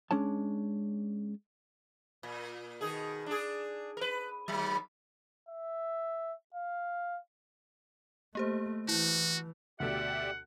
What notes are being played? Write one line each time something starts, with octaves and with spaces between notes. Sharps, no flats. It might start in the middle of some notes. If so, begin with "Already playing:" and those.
G#3 C#4 D4 C#5 A5
A#2
B2 D#3 G#4
D4 G#4
A#4 B4
D#2 F#3
E5
F5
A3 A#3 G4 C5
E3 E4 F#4
D2 B2 G4 A4 D5 E5 F#5